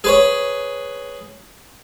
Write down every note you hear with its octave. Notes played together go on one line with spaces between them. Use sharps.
G#4 B4 C#5